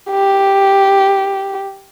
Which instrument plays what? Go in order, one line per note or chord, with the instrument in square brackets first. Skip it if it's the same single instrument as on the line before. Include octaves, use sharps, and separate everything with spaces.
[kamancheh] G4